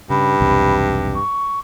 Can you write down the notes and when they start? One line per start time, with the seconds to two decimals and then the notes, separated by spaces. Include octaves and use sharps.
0.10 G2 C#3 B5
0.40 B1 E2 C3
1.15 C#6